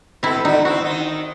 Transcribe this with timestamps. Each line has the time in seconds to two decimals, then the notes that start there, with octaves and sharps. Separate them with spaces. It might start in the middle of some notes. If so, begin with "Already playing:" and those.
0.23 B2 C4 E4 A4
0.45 D3 D#4 F#4
0.65 C4 E4 F#4
0.84 D#3 D#4